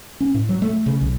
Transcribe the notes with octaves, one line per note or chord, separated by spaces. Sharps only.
C#4
A2
F#3
A3
C#3
B1